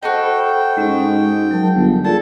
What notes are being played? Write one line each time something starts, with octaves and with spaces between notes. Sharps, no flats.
F#4 A4 C5 D#5 G5 B5
G#2 G#3 C#4
D#4
F#3 A#4 A5
G1
A#2 G#4 A4 A5